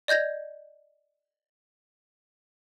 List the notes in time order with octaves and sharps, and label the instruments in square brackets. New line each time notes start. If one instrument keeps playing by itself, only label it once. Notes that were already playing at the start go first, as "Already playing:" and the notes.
[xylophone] D5 D#5 G6 G#6 A#6